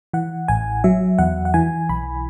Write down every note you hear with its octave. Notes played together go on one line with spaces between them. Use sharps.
E3 F#5
A1 G#5
F#3 E5
E2 F#5
F#5
E3 G#5
B1 B5